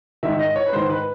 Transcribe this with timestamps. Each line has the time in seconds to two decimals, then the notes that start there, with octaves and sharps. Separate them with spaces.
0.23 G#2 D#3 E5
0.39 D#5
0.56 C#5
0.66 B4
0.72 G#2 D#3 C5
0.90 B4